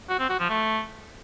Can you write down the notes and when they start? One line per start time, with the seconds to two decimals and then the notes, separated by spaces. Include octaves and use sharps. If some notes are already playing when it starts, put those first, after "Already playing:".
0.09 F#4
0.19 C4
0.29 F#4
0.39 F3
0.49 A3